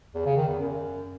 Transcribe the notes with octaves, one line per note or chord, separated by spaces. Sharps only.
E2
C#3
D#3
E2
F#2